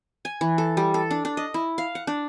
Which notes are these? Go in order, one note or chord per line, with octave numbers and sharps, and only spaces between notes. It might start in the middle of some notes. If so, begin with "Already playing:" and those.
G#5
E3
A4
G3
A4
D4
D4
D#5
E4
F5
F#5
D4